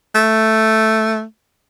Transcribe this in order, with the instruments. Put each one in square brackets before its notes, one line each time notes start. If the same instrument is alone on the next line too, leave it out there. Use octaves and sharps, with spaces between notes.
[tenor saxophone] A3